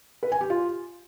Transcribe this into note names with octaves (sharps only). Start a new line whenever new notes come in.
B4
G#5
G4
F4